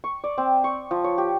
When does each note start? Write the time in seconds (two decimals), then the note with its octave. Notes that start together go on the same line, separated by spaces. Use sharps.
0.04 C#6
0.24 D5
0.38 C4
0.64 C#6
0.91 F3
1.04 C#5
1.18 G4